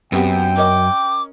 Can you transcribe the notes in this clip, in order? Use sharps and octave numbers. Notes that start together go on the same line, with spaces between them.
F#2 B3 C4 G4 G5
C#4 A#4 D#5 D6